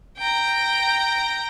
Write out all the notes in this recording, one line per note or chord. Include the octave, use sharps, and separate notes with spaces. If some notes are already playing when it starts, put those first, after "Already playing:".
G5 A#5